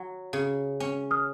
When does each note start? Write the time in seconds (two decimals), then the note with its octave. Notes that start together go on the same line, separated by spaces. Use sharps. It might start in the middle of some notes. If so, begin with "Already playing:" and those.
Already playing: F#3
0.33 C#3
0.80 C#4
1.11 D#6 F6